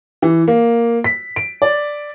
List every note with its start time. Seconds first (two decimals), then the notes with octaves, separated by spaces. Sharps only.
0.22 E3
0.48 A#3
1.04 B6
1.36 D7
1.62 D5